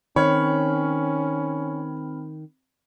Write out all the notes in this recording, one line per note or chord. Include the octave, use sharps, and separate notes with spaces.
D#3 C4 C#4 C#5 B5 F6